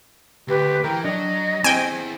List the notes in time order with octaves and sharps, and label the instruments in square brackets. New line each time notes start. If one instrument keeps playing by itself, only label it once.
[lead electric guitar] D2 [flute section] G4 B4
[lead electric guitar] E3 [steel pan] A#4 [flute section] G5
[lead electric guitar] F#3 [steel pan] D4 [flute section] D#5
[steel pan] C4 [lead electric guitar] E4 G#4 [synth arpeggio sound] G5 G#5